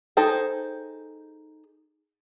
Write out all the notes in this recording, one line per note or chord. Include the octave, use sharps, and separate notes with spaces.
D#4 G#4 A4 C5 G5